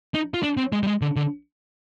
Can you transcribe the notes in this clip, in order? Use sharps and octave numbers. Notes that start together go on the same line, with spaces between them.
D#4
F4
D4
C4
G#3
G3
G#3
D3
D3